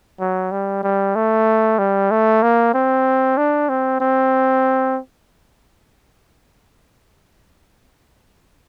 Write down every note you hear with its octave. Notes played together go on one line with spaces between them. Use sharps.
F#3
G3
G3
A3
G3
A3
A#3
C4
D4
C4
C4